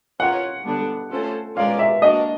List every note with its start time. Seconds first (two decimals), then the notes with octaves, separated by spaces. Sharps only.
0.19 C#4 F4 A#4 C#5 F#5
0.65 D3 G3 B3 D4
1.10 A3 C#4 F4 A4 C5
1.56 G#3 C#4 F4 A#4 D5 F5
1.79 E5
2.02 A#3 D4 F#4 D#5